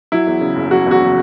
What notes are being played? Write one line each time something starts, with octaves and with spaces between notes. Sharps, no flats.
F#3 E4
E2
C#3
F#1
F#3 F#4
E2 F#4
C#3